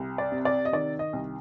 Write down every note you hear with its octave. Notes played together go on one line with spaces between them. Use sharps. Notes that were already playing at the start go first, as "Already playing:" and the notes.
Already playing: C2
D5
C3
D5
D#5
D#3 D5
D#5
C2